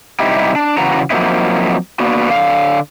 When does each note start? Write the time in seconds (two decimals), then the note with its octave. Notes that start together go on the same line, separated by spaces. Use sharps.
0.20 C3 G3 D#4 E4 G4
0.55 D4
0.78 C#3 E3 F#4 A#5
1.10 F3 F#3 A#3 C4 D#4 E4
2.00 A#3 B3 D4 F#4
2.29 D3 F5